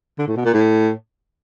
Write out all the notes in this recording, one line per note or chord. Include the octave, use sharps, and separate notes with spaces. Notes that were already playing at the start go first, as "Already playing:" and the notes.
D3
A2
B2
A#2
A2